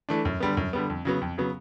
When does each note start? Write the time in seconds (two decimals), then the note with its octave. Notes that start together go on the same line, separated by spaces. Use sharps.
0.09 E3 A3 D4
0.25 F#2
0.40 D3 G3 B3
0.57 F#2
0.73 D3 G3 B3
0.90 F2
1.05 C#3 F#3 B3
1.21 F2
1.38 C#3 F#3 B3